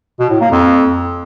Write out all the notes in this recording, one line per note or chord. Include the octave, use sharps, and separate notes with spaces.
B2
A2
A#3
F2